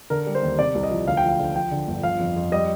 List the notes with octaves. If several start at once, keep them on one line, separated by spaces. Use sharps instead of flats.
D3 A#4
G3
C5
D#2
C3 D5
C2
D#5
F3
D2 F5
G5
F3
F5
D3
F3 G5
D3
G1
F3 F5
F2
F2
G3 D#5